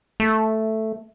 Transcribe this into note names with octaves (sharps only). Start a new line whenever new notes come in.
A3